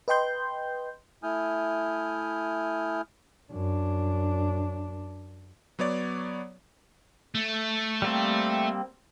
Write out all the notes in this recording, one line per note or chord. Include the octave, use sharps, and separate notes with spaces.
B4 D#5 G5 C6 G6
A3 E4 G#5 D#6 F6 G6
F#2 D4
F#3 B3 C#5 D5
A3
G3 A#3 C4